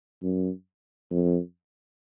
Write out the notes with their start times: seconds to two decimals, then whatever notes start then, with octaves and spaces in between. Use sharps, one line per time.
0.23 F#2
1.11 F2